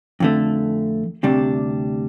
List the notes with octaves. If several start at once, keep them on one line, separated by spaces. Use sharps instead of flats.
F2 D3 A3
D2 C3 G3 D4